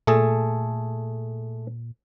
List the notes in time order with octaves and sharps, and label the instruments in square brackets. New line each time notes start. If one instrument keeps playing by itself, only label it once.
[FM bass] A#2 [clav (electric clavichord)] A3 G#4 A4